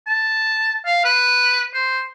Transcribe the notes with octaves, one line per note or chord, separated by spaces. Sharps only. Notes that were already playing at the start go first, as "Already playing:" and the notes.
A5
F5
B4
C5